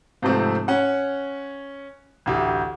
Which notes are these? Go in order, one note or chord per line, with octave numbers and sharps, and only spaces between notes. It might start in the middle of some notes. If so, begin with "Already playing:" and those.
G#2 C3 F3 A3 C4
C#4 C#5 F#5
A1 D2 G4